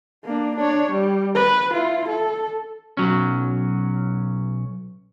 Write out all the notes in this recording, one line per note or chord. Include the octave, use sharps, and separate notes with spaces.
A#3 D4
D4 C#5
G3
B4
E4 F4
A4
B1 F#3 C#4